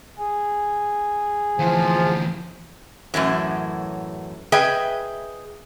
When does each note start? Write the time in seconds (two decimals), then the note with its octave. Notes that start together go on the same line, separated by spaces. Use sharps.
0.18 G#4
1.59 D2 E3 F3
3.14 F#2 A2 E3 F#3
4.52 G#4 B4 D#5 E5 G5